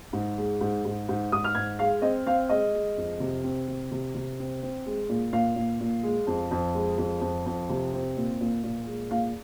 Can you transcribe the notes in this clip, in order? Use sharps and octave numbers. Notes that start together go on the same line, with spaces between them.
G#2
G#3
G#2
G#2
G#2
G#2 D#6
F6
G#2 G#6
G#3 F5
C4 D#5
C4 F5
G#3 D#5
G#3
F2
C3
C4
C3
C3
C3
C4
C4
G#3
A#2
A#2 F5
A#2
A#2
G#3
F2
F2
G#3
F2
F2
F2
C3
C4
A#2
A#2
A#2
G#3
A#2 F5